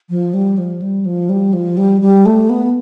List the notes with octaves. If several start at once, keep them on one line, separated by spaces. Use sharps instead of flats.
F3
G3
F3
G3
F3
G3
F3
G3
G3
A3
B3